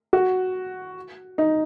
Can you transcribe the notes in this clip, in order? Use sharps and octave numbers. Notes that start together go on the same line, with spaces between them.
F#4
D#4